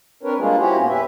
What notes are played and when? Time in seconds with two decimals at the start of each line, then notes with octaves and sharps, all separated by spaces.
0.23 C4 D4 A#4 B4 C#5
0.39 G3 G#3 A#3 D4 F4 G#4
0.59 C#4 E4 F#4 G4 C5 C#5
0.77 A#2 A#3 B3 C#4
0.89 F2 G4 B4 E5